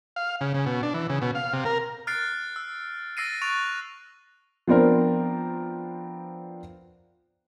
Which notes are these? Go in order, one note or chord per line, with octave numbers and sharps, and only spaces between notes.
F5
C#3
C#3
B2
D4
E3
C#3
B2
F5
C3
A#4
F6 F#6 A6 C7 D7
E6
E6 A6 A#6 C7 D7 D#7
C#6 F#6 A6 D7 F7
F3 B3 C4 D4 A#4